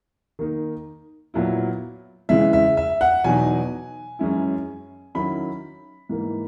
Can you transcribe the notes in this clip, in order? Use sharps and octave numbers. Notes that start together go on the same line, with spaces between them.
D#3 A#3 D#4
A#2 F#3 B3 E4
C#3 E3 G#3 E5
E5
E5
F#5
E2 B2 F#3 B3 D#4 G#5
F#2 E3 G#3 C#4 E4
D#3 F#3 C#4 E4 B5
G#2 E3 A#3